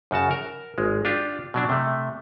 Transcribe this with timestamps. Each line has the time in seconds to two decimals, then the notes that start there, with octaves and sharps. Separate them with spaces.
0.11 F#2 C#3 F#4 A5
0.31 A#4
0.78 G#1 G#3
1.05 D4 F4 G4
1.54 B2 F#3 D4
1.69 C3 A3